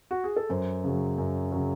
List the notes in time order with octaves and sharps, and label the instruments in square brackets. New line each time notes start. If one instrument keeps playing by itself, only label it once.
[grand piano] F#4
G#4
A4
F#2 C5
C#3 F#3
F#2
C#3 F#3